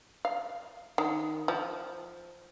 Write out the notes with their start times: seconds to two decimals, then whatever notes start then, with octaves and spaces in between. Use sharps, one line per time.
0.25 F5
0.98 D#3
1.48 F3